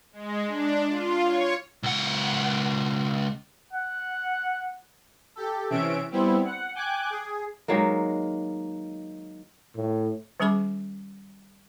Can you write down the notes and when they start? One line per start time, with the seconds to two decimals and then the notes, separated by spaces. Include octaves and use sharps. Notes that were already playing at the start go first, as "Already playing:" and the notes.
0.13 G#3
0.46 D4
0.88 F4
1.23 C#5
1.83 C#2 F#5
3.73 F#5
5.36 G4 A4
5.70 C3 E3 C#4 E5 D7
6.11 G3 B3 C4 E4
6.45 F#5
6.75 G5 G#5 D6 F#6
7.10 G#4
7.68 D#3 F#3 G#3 A#3
9.76 A2
10.40 D#3 G3 C#4 G#4 B5 D6